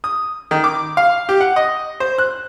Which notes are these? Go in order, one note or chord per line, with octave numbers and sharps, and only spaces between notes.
D#6
D#3
D6
F5
G4
F#5
D#5
C5
F#6